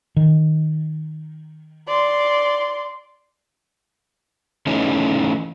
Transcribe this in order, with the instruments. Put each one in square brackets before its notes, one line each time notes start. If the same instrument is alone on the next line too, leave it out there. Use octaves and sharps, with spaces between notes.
[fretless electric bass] D#3
[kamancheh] D5 C6
[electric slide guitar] E3 A3 C#4 D#4